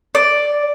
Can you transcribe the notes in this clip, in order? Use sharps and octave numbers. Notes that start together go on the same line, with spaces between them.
D5